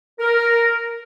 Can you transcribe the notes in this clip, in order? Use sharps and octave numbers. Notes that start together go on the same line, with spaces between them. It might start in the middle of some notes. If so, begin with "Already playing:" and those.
A#4